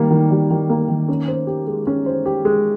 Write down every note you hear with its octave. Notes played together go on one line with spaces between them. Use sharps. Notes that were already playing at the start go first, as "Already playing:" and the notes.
Already playing: D#3 G3 A#3
D#3
G3
D#3
A#3
D#3
C#4
C5
G4
G#3
C#4
C5
G4
G#3